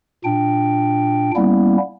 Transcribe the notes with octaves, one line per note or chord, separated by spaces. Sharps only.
A#2 D4 G5
G3 A#3 B3 C#4 E4